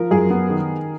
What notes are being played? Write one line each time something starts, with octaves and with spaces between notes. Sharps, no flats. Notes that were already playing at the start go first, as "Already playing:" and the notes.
Already playing: F3 A#4
F#2 G#4
B3
D#3